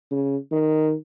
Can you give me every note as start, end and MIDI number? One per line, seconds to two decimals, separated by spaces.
0.11 0.37 49
0.52 0.94 51